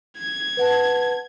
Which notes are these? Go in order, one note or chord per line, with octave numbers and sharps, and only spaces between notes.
G#6
B4 F#5 A5